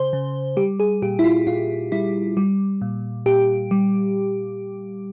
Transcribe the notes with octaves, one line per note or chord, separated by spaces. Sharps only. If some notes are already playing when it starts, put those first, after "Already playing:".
Already playing: C#3 C5
C#3
G3 G4
G#4
A#2 G4
E4
F4
A#2 F4
G3 E4
G3
A#2
A#2 G4
G3